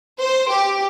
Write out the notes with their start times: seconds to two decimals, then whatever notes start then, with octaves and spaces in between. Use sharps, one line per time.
0.20 C5
0.50 G4